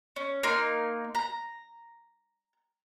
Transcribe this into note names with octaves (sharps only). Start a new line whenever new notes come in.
C#4
A#3 D#4 C6
A#5